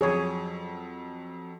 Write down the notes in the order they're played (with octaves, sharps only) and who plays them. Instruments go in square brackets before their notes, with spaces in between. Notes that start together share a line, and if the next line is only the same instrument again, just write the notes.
[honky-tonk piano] F2 F#3 [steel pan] G#4 C#5